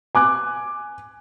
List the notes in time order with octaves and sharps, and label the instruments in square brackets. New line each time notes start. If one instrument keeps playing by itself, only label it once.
[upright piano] G#5 D6 F#6